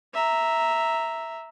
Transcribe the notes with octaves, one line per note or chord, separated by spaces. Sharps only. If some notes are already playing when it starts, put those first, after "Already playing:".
E5 A#5